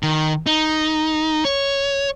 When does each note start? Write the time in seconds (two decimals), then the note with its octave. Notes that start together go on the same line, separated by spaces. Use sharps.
0.03 D#3
0.46 D#4
1.45 C#5